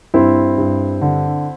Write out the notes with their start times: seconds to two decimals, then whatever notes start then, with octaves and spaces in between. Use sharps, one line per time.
0.14 G2 C4 E4
0.58 G2
1.01 D3